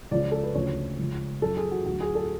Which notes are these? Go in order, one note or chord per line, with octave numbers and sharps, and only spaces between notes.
C#2 C#3 F3 D5
A4
B4
D2 C#3 F3 C#5
C#2 C#3 F3
F#2 F3 A4
G#4
F#4
D2 D3 F#3 F#4
G#4
A4